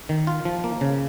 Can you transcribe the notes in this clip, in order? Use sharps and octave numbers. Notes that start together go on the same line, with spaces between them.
D#3
F4
F3
A#3
C#3